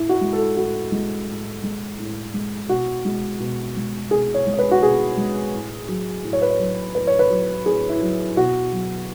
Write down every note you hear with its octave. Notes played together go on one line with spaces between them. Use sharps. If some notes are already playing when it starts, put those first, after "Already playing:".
Already playing: A2 E4
F#4
G#3
A4
A2 F#4
G#3
A2
G#3
A2
G#3
B2 F#4
G#3
B2
G#3
B2 G#4
C#5
G#3
C#5
B4
F#4
B2 G#4
G#3
A2
F#3
A2
C#5
B4
C#5
F#3
A2 B4
C#5
B4
F#3
A2 G#4
E4
F#3
B2 F#4
F#3